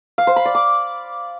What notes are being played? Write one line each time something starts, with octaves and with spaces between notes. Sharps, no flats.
F5
C5
B5
D5
D6